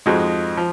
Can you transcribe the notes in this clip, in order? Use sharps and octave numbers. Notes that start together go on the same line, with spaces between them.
F2 F3 G#3 D#4 F#4
F3